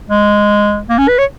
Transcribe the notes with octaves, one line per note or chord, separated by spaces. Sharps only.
G#3
A#3
C#4
B4
C#5